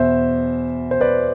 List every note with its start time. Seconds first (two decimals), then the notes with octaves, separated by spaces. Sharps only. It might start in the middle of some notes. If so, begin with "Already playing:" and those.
Already playing: E2 B2 C5 E5
0.91 C5
1.01 B4 D5